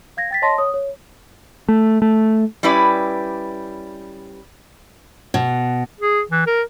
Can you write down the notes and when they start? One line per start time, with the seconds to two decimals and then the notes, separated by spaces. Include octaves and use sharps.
0.17 F5 G#6 A#6
0.31 G5 A6 B6
0.42 C#5 D#5 A5 C6 A#6
0.58 C#5 D#6
0.74 C#5
1.68 A3
2.02 A3
2.63 G3 C#4 E4 B4 D5
5.34 B2
6.01 G#4
6.31 E3
6.47 A#4